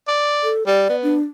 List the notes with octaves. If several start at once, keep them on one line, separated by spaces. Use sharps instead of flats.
D5
A4
G3 D5
B3
D4